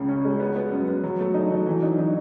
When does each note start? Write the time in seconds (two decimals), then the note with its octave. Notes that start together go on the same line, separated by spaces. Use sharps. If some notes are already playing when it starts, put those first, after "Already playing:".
Already playing: C#2 C#3
0.09 C#4
0.25 G#3
0.40 B3
0.56 B3
0.71 F#2
0.88 B3
1.04 F#3
1.19 A3
1.34 D#4
1.50 F#3
1.66 E3
1.82 D#4
1.98 D#4